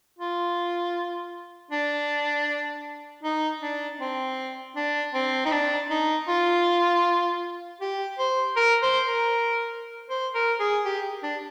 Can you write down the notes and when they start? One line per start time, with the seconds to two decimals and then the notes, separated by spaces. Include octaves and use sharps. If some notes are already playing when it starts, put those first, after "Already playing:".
0.19 F4
1.71 D4
3.23 D#4
3.62 D4
4.00 C4
4.76 D4
5.14 C4
5.45 D#4
5.52 D4
5.90 D#4
6.28 F4
7.81 G4
8.19 C5
8.56 A#4
8.82 C5
9.07 A#4
10.10 C5
10.35 A#4
10.60 G#4
10.85 G4
11.23 D4